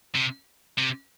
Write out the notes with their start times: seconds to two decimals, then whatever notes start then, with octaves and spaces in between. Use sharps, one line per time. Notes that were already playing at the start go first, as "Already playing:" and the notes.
0.15 C3
0.78 C3